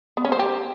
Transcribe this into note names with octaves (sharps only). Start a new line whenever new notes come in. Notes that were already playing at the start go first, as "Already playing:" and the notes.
B3
C#4
C5
G4